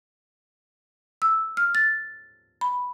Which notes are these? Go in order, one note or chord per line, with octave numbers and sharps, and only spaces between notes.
E6
F6
A6
B5